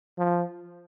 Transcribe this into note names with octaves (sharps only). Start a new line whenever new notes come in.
F3